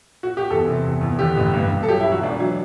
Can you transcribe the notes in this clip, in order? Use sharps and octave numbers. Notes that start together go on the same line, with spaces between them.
F#4
G4
E2 A4
C3
E2
E2
D3 G4
A1
G2
G2
A4
F#3 G4
E4
E1
F#4
E1 D4
F#3